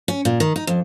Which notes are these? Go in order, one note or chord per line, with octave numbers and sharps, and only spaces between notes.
C#4
A#2
D#3
D#4
F2